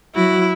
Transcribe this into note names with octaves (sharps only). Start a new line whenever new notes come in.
F#3 E4 F#4